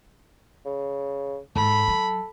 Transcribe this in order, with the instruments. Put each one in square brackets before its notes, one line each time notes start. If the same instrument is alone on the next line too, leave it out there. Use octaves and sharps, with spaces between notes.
[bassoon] C#3
[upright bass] G#2 [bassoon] A4 [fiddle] B5
[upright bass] F#3